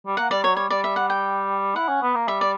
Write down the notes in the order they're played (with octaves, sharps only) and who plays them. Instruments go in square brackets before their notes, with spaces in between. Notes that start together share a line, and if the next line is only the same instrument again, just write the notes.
[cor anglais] G3
[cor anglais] A#3 [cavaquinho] F#5
[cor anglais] G3 [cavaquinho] D5
[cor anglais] F#3 [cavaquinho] C#5
[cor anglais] G3 [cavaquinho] C#5
[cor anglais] G3 [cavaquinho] D5
[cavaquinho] E5
F#5
G5
[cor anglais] E4 [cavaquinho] F#5
[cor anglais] C#4
B3
A#3
[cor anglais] G3 [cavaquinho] E5
[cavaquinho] D5